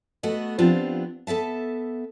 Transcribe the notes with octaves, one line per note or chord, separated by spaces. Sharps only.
A3 B3 F#4 D#5
F3 B3 C4 D4 F4 G4
B3 A4 E5 A5